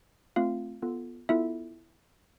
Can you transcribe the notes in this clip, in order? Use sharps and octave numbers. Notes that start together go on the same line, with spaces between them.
A3 C4 F4 F5
B3 F4 A4
B3 E4 F4 A4 E5